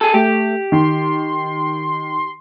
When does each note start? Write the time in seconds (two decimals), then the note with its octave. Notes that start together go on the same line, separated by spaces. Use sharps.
0.01 G#4 A4
0.14 A3 G4
0.72 D#3 C6